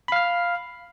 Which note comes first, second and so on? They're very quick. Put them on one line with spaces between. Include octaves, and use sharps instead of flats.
B5 F5 F6